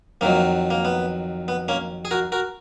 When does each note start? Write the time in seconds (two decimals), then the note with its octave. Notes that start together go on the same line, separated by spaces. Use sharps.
0.21 F2 D#3 F#3 A#3
0.70 A#3
0.85 B3
1.48 B3
1.68 A#3 C#4
2.05 G#4
2.11 F#4 A#4
2.32 F#4 A#4